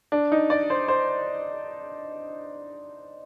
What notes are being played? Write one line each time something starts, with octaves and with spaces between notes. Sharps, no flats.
D4
D#4
D5
C5
C5